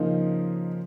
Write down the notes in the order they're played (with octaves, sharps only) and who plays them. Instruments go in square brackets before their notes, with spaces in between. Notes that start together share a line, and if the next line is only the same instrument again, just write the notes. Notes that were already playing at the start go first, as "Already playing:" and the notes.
Already playing: [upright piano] C#3 F3 A#3 D#4